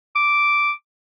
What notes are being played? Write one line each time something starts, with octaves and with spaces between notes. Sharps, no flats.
D6